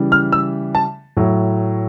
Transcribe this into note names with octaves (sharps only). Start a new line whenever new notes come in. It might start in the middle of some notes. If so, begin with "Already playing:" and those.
Already playing: C#3 E3 G3
F6
E6
A5
A2 F#3